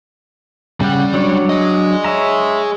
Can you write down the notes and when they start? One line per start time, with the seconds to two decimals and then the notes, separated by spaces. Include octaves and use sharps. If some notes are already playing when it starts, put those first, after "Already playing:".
0.81 C#3 G3 F#5
1.14 F#3 D4 C#5
1.49 G#4 D#5
2.04 C#5 E5 A#5